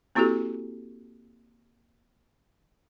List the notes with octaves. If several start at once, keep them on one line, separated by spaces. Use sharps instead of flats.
A#3 C4 E4 F#4 G4 A4